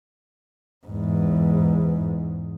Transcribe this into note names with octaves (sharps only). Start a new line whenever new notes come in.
E2 G#2